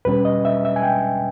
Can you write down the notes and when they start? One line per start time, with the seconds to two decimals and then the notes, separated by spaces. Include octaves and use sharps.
0.05 E2 B2 G3 C#4 B4
0.25 D#5
0.45 E5
0.65 E5
0.76 G#5
0.83 G5